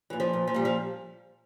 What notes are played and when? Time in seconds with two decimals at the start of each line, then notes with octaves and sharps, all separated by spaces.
0.10 A#2 E3
0.20 F3
0.33 A#2
0.47 F3
0.54 A#2 G3
0.65 F3